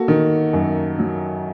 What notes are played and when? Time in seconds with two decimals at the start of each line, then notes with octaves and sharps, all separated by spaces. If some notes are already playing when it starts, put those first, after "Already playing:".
Already playing: A#3 F#4 A4
0.08 D#3
0.53 F#2
0.99 F#3